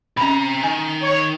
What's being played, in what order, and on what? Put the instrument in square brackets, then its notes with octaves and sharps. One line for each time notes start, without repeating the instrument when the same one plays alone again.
[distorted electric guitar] C3 A#5 [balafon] C#4 B5
[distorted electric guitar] D#3 [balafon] G#5
[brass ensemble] C#5